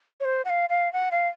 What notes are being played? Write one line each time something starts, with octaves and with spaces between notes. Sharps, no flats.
C#5
C5
F#5
F5
F5
F#5
F5